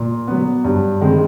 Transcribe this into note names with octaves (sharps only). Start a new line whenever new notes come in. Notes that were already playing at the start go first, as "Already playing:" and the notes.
Already playing: A#2
F#3 B3
G2
D#3 G#3 C4